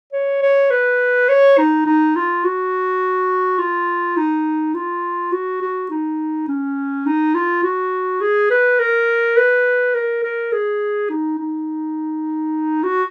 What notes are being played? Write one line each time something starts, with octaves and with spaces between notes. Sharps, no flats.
C#5
C#5
B4
C#5
D#4
D#4
F4
F#4
F4
D#4
F4
F#4
F#4
D#4
C#4
D#4
F4
F#4
G#4
B4
A#4
B4
A#4
A#4
G#4
D#4
D#4
F#4